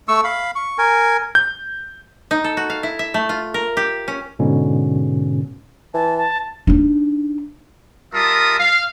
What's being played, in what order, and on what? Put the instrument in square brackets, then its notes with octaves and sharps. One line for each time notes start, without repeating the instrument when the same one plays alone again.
[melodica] A3 C#6 E6
F5 B5
C#6
A#4 G#5
[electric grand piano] G6
[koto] D#4
A4
F#4
F5
E4
E5
A3
F4
A#4
G4
C#4
[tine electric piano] G#2 B2 D3 C#4
[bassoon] E3 [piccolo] A5
[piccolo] A5
[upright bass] D4 D#4
[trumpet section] G3 F4 A#4 E5 A5 D#6
F5